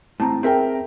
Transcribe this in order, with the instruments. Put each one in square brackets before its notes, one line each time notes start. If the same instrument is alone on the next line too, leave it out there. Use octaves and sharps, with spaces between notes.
[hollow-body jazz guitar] A2 C4 [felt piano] A5 A#5
[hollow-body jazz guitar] C4 E5 [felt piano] G#4 A#4 G5